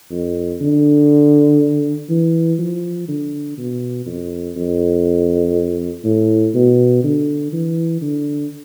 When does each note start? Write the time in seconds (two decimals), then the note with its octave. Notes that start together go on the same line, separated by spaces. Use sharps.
0.11 F2
0.61 D3
2.09 E3
2.59 F3
3.08 D3
3.57 B2
4.06 F2
4.56 F2
6.04 A2
6.54 B2
7.04 D3
7.53 E3
8.01 D3